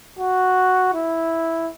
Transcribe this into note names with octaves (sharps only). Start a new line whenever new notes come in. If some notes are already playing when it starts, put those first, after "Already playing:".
F#4
E4